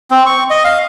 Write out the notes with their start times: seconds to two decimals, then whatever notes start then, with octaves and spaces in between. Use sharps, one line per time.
0.11 C4
0.26 C#6
0.50 D#5
0.64 F5